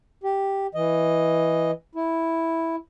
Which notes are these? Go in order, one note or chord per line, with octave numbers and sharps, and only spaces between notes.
G4
E3 D#5
E4